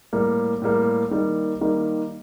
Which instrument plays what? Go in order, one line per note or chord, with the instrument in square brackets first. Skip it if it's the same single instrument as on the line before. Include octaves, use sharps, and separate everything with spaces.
[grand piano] A2 G3 A#3
A2 G3 A#3
D#3 G3 A#3
D#3 G3 A#3